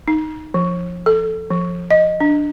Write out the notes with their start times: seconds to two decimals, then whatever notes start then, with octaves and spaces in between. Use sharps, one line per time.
0.08 D#4
0.54 F3
1.06 A4
1.50 F3
1.91 D#5
2.20 D4